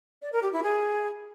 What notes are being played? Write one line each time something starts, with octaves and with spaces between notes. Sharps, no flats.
D5
A#4
G4
E4
G#4